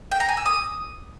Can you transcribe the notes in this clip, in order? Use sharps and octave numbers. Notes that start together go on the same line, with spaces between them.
G5
A#5
G#5
E6
D#6